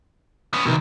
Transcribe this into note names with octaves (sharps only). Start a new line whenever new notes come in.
B3 C#4
C2 B2 D#3